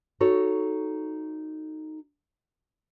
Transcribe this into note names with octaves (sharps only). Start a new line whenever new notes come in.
D#4 F#4 A4 C#5